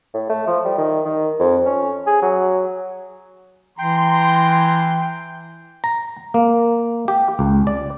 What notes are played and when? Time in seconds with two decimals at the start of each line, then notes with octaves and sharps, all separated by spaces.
0.14 A2
0.30 A3
0.47 F3
0.65 G3
0.78 D#3
1.05 D#3
1.40 F2
1.66 C#4
2.07 G#4
2.22 F#3
3.79 E3 G5 A#5 C6
5.84 A#5
6.34 A#3
7.08 G4
7.39 C#2
7.67 D5